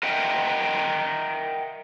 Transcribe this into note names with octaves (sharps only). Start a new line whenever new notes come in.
A#4 D#5 E5 F#5 G5